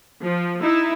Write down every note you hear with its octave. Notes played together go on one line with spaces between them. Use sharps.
F3
D#4 E4 E5